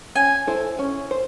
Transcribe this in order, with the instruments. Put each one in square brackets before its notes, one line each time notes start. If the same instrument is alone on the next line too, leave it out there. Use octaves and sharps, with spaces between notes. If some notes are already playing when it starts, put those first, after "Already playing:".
[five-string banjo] C#4 [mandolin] G#5
[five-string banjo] E4 A4 C5
C#4
C5